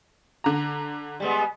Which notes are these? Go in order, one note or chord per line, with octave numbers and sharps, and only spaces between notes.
D3 A#5
G3 G#3 B3